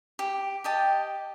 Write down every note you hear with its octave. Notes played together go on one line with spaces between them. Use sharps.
G4
G4 D#5 G5 A5